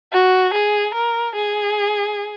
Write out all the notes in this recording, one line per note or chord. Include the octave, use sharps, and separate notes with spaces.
F#4
G#4
A#4
G#4